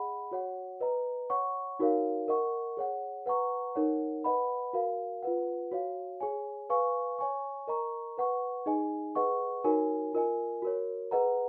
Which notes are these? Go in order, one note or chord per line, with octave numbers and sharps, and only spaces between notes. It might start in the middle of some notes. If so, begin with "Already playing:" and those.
Already playing: G#4 D#5 F#5 B5
F#4 C#5 F#5
B4 D#5 A#5
C#5 F#5 C#6
D#4 F#4 A#4 C#5 F5
A#4 D#5 F#5 C#6
G#4 C#5 F#5
B4 F#5 A#5 C#6
D#4 A#4 C#5 F#5
B4 D#5 F#5 B5
F#4 A#4 F5
F4 B4 F#5
F#4 C#5 F5
G#4 C#5 G#5
B4 F5 G#5 C#6
C#5 G#5 C#6
A#4 D#5 A#5 C#6
B4 F#5 C#6
D#4 G#4 D#5 G#5
G#4 B4 D#5 F#5 C#6
D#4 F#4 A#4 C#5 G#5
F4 A#4 D#5 G#5
F#4 A#4 C#5
G#4 B4 D#5 F#5 A#5